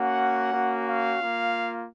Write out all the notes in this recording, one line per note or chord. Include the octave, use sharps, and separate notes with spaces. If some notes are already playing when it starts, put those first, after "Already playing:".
Already playing: A#3 C#4 F#4 F#5
A#3 C#4 F#4
F5
A#3 F4